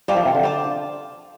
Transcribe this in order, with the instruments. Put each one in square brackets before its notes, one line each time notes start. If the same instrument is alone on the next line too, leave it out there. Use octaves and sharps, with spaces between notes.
[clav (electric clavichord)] G3 [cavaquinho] F4 C5 A5 D6
[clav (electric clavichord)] F3
C3
D3
[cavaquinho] F4 C5 A5 D6